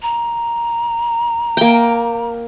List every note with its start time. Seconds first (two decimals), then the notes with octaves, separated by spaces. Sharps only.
0.02 A#5
1.57 A#3 G5